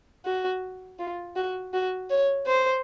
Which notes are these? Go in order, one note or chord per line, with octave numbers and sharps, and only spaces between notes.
F#4
F4
F#4
F#4
C#5
C5